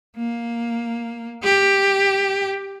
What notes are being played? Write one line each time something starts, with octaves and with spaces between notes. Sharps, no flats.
A#3
G4